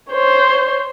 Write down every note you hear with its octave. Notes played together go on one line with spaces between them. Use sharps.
C5 C#5